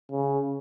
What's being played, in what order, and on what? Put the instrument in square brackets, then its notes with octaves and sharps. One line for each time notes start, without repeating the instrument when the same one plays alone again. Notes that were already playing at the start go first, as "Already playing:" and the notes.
[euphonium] C#3